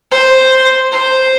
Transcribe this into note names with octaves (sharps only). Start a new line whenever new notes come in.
C5
C5